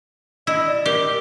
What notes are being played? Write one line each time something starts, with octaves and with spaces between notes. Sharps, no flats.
E4 D#5
D5
G4 A#4